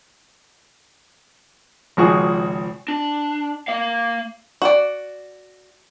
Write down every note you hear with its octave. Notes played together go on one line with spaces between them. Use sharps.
G#1 C#2 F3 F#4 G#4 C#6
D4
A#3 F5
F#4 D5